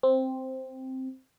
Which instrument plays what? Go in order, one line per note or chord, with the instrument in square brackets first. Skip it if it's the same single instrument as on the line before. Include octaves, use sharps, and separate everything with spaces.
[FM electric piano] C4